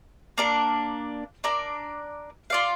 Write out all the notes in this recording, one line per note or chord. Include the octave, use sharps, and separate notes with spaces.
A#3 D4 A#4
D4 A#4 D5
F4 D5 F5